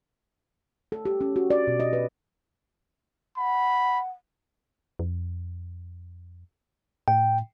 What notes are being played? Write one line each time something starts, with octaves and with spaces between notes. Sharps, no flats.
A4
G4
C#4
F#4
D5
B2
D#5
B4
F#5 B5
F2
A2 G5